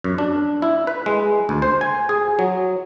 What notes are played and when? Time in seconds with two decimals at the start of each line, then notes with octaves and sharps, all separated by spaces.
0.04 F#2
0.18 D4
0.62 E4
0.87 B4
1.06 G#3
1.49 D2
1.62 C5
1.81 G#5
2.09 G#4
2.39 F#3